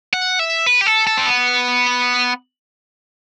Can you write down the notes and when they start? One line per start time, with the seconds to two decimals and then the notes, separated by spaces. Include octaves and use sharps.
0.13 F#5
0.39 E5
0.66 B4
0.81 G4
0.86 A4
1.07 A4
1.17 C4
1.26 B3